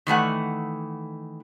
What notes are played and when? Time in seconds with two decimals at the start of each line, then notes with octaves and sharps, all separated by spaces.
0.07 D#3 E3 A3 F#5